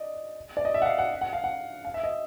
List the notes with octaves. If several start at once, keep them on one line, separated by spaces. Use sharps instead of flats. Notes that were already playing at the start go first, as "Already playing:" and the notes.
Already playing: D5 D#5
D5
D#5
E5
F#5
F5
F#5
F#5
F5
F#5
F5
E5
D#5